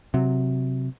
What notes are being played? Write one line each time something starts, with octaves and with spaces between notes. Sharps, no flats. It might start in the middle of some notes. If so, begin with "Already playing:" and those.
C3 F#3